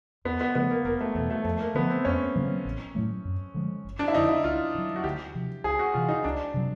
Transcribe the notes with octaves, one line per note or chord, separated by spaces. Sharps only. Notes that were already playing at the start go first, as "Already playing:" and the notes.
E2 B3
B3
C#3 F3 A3 B3
A#3
F1 A#3
A3
E2 B2 A3
A3
F2 A3
A#3
D3 F3 B3
C4
F2 C#4
C#3 F#3 A#3
A1
A2 F#3 A3
F#2
D3 F3 G#3
G1
D4
E4
F2 D3 D#4
E4
C#2 F4
C#3
F#3
F#4
D2 G4
C3 F3
C#2 G#4
F#4
C3 E3 F4
D#4
C#2 D4
C3 D#3 F#3